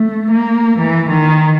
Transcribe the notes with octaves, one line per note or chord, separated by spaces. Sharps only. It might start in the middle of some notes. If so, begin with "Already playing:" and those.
Already playing: A3
A#3
E3
D#3